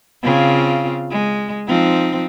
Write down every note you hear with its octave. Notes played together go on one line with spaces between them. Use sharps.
C#3 C4 F4
G#3
F3 C4 D#4